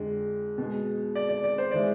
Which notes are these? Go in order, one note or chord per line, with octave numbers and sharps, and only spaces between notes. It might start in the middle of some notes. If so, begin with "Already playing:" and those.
Already playing: F2 D3 G#3
B2 G#3
D5
D5
D5
C5
E3 G#3 D5